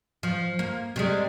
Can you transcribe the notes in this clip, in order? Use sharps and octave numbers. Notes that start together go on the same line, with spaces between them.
F3
A#3
C3 G3 G#3